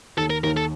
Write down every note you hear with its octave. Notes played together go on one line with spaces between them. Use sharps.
D#2 A4
A#4
D#2 A#4
A4